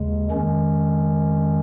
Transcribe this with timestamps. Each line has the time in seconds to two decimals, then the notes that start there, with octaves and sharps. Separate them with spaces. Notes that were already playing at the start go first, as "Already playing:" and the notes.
Already playing: D#2 C#3 G#3
0.31 F2 D#3 G#3 C#4